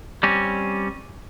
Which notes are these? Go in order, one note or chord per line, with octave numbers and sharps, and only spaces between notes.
G3 C4 C#4